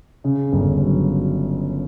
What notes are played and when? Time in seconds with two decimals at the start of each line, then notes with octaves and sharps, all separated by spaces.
0.24 C#3
0.52 G1
0.82 F#3